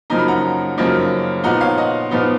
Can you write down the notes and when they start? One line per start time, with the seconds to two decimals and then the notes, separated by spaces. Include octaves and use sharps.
0.10 F#2 C#3 F3 A#3 D#4 A#5
0.19 B5
0.28 F#5 A#5
0.77 F#2 C#3 F3 A#3 D#4
1.44 A#2 F3 B3 D#4 F#5 A#5
1.61 C#5 F5
1.77 D#5 F#5
2.11 A#2 F3 B3 D#4